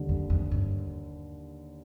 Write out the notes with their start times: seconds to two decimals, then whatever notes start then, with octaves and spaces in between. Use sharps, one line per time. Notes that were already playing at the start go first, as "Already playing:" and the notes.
Already playing: D#2 D3 G3
0.09 F2
0.30 F2
0.52 G2